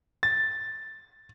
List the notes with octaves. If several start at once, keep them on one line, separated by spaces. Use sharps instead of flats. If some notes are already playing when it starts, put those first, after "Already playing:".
A6